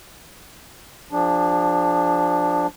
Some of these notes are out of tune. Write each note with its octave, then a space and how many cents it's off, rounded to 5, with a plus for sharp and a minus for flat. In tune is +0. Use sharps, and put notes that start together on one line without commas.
F3 +0 D4 +0 G#4 -40